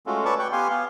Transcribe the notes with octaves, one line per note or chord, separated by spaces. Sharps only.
G#3 A3 C#4 F4 F#4 A4
B4 C#5 D5 A5 C#6 D6
G5 C#6 F#6
B3 G4 F5 G#5 C6
B3 F5